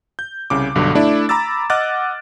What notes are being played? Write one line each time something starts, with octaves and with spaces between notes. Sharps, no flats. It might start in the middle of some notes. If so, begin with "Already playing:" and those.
G6
C2 C#3 D6
B1 G2 D3 F#4
A3 D4 E4
A#5 B5 D6 E6 A6
D#5 F#5 D6 F6 F#6 A6